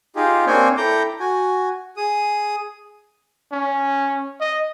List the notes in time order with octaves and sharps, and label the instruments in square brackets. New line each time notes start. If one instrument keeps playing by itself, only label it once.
[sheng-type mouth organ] D#4 F4 G4 G#4
A#3 C4 D4 C#5 G5 G#5
E4 A4 G5 A#5 D6 G6
F#4 G#5
G#4 D#6
[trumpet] C#4
D#5